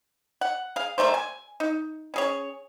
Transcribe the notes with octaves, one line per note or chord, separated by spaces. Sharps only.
F#5
G#4 F5
G3 A3 A#3 C5
G#5
D#4
C#4 G#4 C#5